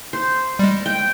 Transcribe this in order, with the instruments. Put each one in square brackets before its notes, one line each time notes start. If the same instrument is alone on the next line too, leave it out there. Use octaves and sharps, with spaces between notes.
[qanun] C5
[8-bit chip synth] G3 G#3
[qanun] G5